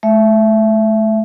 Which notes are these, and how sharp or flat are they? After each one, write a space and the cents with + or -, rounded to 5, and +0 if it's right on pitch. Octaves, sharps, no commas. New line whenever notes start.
A3 -30 E5 +15